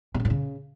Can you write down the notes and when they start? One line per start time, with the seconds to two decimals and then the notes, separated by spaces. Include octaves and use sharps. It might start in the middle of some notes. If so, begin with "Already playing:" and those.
0.14 C3
0.20 C#3
0.25 A2
0.30 C#3